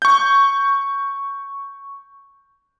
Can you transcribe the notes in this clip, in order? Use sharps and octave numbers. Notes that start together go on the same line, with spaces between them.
C#6 G6